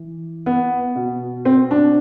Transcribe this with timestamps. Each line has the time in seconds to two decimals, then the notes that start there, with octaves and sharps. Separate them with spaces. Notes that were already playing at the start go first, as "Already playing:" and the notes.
Already playing: E3
0.46 B3
0.96 B2
1.45 C4
1.71 D4